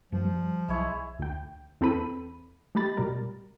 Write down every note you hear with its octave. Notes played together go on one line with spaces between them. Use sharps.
F#2 F3 G3
G3
B1 G#3 E4 C#5
D2 G5
E2 C4 A4 B4 B5 D#7
G#3 A3 G4 B5 A6
B2 G3 A#4